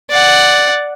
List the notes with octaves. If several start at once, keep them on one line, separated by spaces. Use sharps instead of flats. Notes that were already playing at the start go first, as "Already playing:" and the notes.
D5 F#5